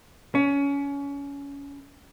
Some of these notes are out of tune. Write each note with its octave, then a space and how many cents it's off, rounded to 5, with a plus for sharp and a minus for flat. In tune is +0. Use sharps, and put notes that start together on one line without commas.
C#4 +25